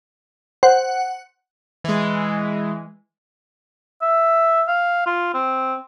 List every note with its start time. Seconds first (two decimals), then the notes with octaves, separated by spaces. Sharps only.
0.63 C5 F#5
1.84 E3 G#3
4.02 E5
4.68 F5
5.06 F4
5.34 C4